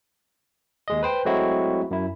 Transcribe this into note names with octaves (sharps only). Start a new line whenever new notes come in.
D#2 G#3 D#5
B4 C5 G5
F#3 G#3 A3 C4 E4 F#4
F#2 E4